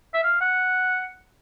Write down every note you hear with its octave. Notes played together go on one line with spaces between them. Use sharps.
E5
F5
F#5